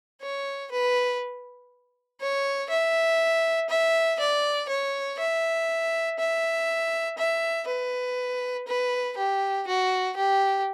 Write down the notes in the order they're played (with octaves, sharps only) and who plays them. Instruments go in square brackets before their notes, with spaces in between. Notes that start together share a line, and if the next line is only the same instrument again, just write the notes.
[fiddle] C#5
B4
C#5
E5
E5
D5
C#5
E5
E5
E5
B4
B4
G4
F#4
G4